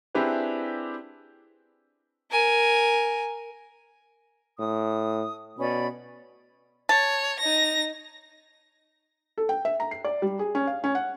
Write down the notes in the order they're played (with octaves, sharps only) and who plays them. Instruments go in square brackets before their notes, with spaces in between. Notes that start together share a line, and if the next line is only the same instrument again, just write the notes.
[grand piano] C4 D4 E4 G4 G#4 B4
[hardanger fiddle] A#4 G#5
[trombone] A2 [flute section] D#6
[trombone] B2 [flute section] C#4 D5 B5
[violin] C#5 [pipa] A5
[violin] D#4 A#6
[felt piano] A4
G5
E5
A#5
C7
D5
G3
G#4
C#4
F5
C#4
F#5